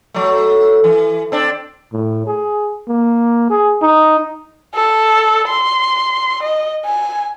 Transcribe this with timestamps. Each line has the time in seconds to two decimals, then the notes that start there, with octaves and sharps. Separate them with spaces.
0.14 F#3 A3
0.84 E3
1.32 C4 D4
1.93 A2
2.27 G#4
2.88 A#3
3.50 G#4
3.82 D#4
4.75 A4
5.50 C6
6.43 D#5
6.86 G#5